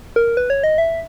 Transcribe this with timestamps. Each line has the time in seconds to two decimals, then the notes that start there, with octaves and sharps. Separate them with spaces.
0.16 A#4
0.37 B4
0.50 C#5
0.64 D#5
0.78 E5